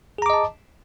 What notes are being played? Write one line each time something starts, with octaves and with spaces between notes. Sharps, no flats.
G#4 D#5 A5 A#5 D6